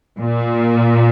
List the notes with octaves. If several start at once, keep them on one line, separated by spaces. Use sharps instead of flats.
A#2